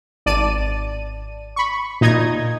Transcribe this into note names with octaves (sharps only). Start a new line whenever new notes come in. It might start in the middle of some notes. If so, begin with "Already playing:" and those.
G#1 D5 A5 D#7
B5 C#6
A#2 D#4 D#5 D#6 G#6